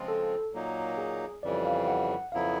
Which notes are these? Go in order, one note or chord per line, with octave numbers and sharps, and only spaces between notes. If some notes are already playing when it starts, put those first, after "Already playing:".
Already playing: C#3 F3 G#3 C4 F4
A4
A#2 F#3 A#3 D#4
G#4
F2 C#3 E3 G3 D5
F5
F#5
F2 C#3 F#3 B3 E4 F5